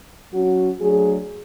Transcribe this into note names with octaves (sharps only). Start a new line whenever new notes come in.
F#3 C#4 F#4
F#3 A3 D4 G#4